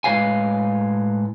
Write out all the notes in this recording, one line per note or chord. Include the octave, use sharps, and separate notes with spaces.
A2 G#3 B4 C#5 F5 G#5